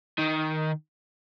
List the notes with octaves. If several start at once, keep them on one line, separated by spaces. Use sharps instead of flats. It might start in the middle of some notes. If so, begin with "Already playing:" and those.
D#3